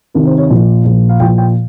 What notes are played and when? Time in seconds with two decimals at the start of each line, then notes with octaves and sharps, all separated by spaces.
0.14 C3 D#3 A#4
0.26 C5
0.38 C#5
0.50 A#2 F3
0.85 A#2 F3
1.09 F5
1.20 A#2 F3 G5
1.38 G5